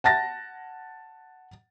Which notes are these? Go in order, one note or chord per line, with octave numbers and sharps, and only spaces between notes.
F#5 A5 A6 A#6